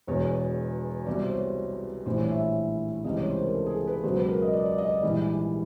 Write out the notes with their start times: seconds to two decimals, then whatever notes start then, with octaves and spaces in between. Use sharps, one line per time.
0.07 E1 E2 B2 C#5
1.06 C2 B2 G3 D5
1.23 C5
1.32 C#5
2.06 A#1 A2 E3 G3 C5
2.18 C#5
2.30 E5
2.43 E5
3.04 C#2 C3 E3 G3 D#5
3.17 C#5
3.30 C5
3.42 A#4
3.54 A4
3.66 G#4
3.71 A4
3.87 B4
4.04 C#2 B2 F#3 C5
4.16 B4
4.29 A#4
4.42 D#5
4.53 D5
4.66 D5
4.78 D#5
4.91 D5
5.03 A#1 G#2 E3 G3